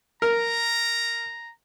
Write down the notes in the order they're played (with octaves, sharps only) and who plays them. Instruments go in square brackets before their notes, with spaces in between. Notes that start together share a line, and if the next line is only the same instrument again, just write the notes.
[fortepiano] A#4 [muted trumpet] A#5